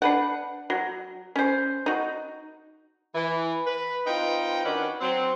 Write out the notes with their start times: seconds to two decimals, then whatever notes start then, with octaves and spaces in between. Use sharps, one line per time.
0.02 D4 B4 F#5
0.70 F#3
1.36 C#4 C5
1.86 D#4 F#4
3.15 E3
3.66 B4
4.07 C4 D#4 F4 B4 G5
4.64 D#3 C#4 D4 F#4 B4
5.00 F#3 C4